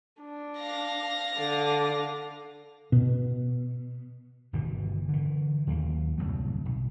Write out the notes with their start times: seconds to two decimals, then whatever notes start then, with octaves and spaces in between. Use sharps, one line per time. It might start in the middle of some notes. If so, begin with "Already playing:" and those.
0.21 D4
0.59 F5 A#6
1.36 D3 D5
2.92 B2
4.53 G1 B2 D#3 E3
5.09 D3 E3
5.67 D#2 F#3 G#3 A#3
6.18 D1 C2 F#2 F#3
6.66 B1